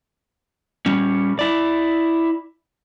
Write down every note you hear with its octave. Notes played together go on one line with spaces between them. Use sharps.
G3 C#4
E4 D5